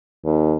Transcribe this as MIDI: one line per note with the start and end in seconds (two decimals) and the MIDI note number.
0.25 0.56 39